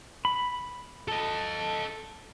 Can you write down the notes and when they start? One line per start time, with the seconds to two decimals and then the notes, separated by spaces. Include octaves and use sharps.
0.25 B5
1.08 A4 D#5